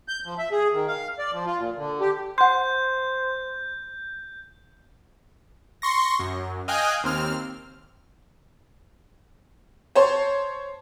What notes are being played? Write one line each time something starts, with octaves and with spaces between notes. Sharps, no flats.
G6
F3
E5
G#4
D#3
F5
D5
F3
F4
A#2
D3
G4
C5 F#5 C6 G6
C6 C#6 A#6
F#2
D#5 F5 G5 G#5 F#6
D#2 C4 F6
C5 C#5 A5 C6